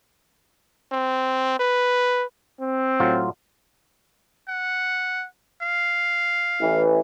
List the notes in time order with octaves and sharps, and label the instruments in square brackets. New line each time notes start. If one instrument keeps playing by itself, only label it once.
[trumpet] C4
B4
[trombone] C4
[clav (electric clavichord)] A2 F#3 F4
[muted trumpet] F#5
F5
[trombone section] A1 E3